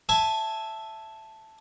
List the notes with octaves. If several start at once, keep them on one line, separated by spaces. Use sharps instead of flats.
E5 G#5 A5